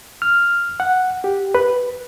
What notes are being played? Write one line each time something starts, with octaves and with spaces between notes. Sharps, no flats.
F6
F#5
G4
B4